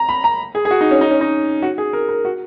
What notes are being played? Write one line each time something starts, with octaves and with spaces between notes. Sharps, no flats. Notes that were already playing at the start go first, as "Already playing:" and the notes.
Already playing: A#5
B5
A#5
G#4
G#4
F#4
D#4
C#4
D#4
C#4
D#4
F#4
G#4
A#4
A#4
F#4